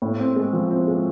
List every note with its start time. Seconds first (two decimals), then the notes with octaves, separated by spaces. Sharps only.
0.02 A2
0.20 C4
0.36 G#3
0.53 F3
0.70 C4
0.87 G#3